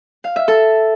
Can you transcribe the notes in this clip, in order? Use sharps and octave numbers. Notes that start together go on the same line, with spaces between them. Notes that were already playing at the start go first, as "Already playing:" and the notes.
F5
E5
A4